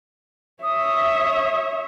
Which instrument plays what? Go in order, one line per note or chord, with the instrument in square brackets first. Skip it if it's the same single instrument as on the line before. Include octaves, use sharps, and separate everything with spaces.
[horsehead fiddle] C#5 E5 [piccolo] D#6